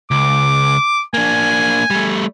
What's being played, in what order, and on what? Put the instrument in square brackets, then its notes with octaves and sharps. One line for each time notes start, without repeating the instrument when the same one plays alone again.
[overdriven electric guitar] C#2 [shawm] D6
[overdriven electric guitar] A#3 D4 [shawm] G#5
[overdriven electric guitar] G3 A3